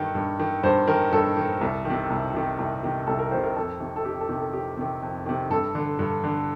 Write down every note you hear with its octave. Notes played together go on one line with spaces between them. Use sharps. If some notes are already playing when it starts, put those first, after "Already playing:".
Already playing: G2 D#3 A4
G2
D#3
G2 C5
D#3 A#4
G2 A4
D#3
C2
C3 D#3
C2
C3 D#3
C2
C3 D#3
C2 A4
A#4
C3 D#3 C5
A#4
F2 A4
C3 D#3
A4
F2 G4
A4
C3 D#3
A4
F2 G4
C3 D#3
F2
C3 D#3
G2 A4
D3
G2
D3